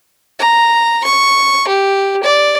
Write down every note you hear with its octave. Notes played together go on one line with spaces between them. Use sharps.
A#5
C#6
G4
D5